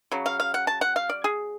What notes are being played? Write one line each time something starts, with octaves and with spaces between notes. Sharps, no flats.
C#3 F#3
F5
F5
F#5
A5
F#5
F5
D5
G#4